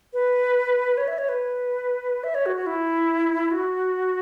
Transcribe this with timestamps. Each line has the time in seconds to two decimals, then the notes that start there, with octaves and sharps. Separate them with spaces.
0.13 B4
0.97 C#5
1.08 E5
1.18 C#5
1.29 B4
2.24 E5
2.35 C#5
2.46 F#4
2.56 F#4
2.66 E4
3.51 F#4